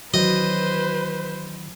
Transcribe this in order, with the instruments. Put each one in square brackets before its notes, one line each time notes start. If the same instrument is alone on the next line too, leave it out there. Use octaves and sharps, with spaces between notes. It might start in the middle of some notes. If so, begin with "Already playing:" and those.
[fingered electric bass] D#3 E3 [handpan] F#3 [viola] B4 C5 [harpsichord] D#5